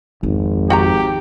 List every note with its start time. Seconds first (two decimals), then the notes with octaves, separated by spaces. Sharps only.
0.23 G#1 F2
0.70 F#4 G4 G5 A#5